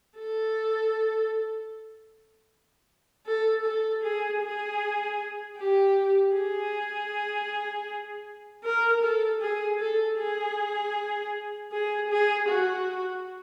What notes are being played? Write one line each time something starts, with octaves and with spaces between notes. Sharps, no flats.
A4
A4
A4
G#4
G#4
G4
G#4
A#4
A4
G#4
A4
G#4
G#4
G#4
F#4